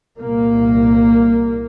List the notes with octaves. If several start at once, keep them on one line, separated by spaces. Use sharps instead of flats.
C2 A#2 A#3